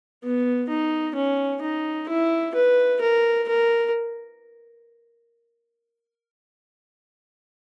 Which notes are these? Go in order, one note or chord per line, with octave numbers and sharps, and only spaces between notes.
B3
D#4
C#4
D#4
E4
B4
A#4
A#4